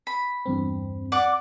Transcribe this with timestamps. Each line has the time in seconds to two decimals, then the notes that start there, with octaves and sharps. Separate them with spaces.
0.07 B5
0.46 E2 G2 C4
1.12 D5 F#5 D6